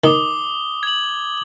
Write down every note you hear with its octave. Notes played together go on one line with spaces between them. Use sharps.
D#3 D6 D#6 G7
G#6 F#7